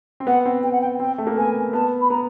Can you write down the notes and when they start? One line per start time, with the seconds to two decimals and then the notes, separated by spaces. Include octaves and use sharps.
0.20 C4
0.27 B3 F#5
0.45 C4
0.63 B3 G5
0.72 F#5
0.81 G5
1.00 C4 G5
1.18 A3
1.27 A#3
1.36 B3 G#5
1.73 B3 A5
2.01 B5
2.10 B3 A#5